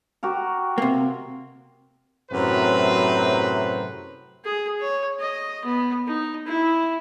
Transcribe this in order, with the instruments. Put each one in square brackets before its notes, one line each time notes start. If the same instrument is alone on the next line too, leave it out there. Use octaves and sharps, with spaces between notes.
[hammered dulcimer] F#4 G4 A#4
[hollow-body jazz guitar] C3 A#3
[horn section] F#2 A2 C3 F#3 B4 C5
[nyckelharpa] G#4
C#5
D#5
B3
D#4
E4